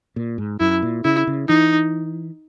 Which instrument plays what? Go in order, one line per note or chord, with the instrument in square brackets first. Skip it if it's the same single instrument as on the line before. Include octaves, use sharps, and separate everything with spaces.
[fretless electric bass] A#2
G#2
[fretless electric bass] F#2 [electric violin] E4
[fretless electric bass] A#2
[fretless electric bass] C#3 [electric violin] E4
[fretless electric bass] C#3
[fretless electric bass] E3 [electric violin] D#4